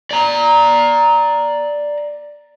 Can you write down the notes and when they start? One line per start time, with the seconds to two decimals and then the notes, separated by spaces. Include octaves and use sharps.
0.11 D5 A#5